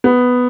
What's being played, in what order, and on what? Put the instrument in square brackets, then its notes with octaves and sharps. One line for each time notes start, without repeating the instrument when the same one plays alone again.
[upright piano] B3